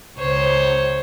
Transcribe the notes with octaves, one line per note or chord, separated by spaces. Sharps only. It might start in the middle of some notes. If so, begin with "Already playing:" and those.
C#2 C5 C#5